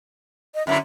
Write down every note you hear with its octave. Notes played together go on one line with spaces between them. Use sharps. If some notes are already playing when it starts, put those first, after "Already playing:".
D#5
F#2 D3 E4 E5